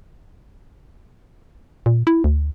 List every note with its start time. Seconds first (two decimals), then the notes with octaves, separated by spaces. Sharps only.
1.86 A#2
2.07 E4
2.24 D2